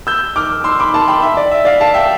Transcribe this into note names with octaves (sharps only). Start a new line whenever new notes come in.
E6 G6
D6 F6
C6 E6
B5 D6
A5 C6
G5 B5
E5
D5
E5
D5 F5
F5 A5
E5 G5